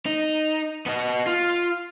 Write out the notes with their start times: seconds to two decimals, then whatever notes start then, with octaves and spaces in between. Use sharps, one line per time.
0.06 D#4
0.86 B3 D#5
1.27 F4